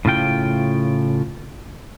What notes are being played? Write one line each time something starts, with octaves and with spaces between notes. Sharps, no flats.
A2 C#3 F4 G5